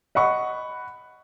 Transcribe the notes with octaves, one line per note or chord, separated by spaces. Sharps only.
D#5 F#5 B5 C#6